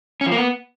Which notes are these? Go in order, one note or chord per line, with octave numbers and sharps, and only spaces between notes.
C#4
F3
A#3
B3